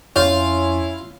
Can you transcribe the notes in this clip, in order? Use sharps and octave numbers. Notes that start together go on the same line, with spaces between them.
F2 C#4 E4 F4 C#5